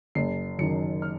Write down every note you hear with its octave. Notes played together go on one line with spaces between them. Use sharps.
F#1 C7
F#2 D#3 C#7
F6